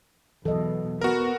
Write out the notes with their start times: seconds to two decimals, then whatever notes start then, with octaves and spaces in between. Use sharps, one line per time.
0.45 E2 B2 E3 F#3 A4 D#5
1.01 B3 F#4 A#4